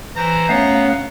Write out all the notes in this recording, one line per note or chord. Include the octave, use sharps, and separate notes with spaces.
E3 C5 A#5
A3 B3 C#4 C#5 F5 F#6 C7